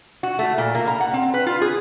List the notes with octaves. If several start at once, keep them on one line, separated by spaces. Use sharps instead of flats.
F#4
A3
A#2
A#3
A#5
F#5
C4
B4
F4
G#4